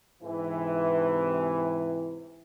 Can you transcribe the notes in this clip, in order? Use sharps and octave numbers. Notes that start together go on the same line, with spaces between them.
G#2 C3 E3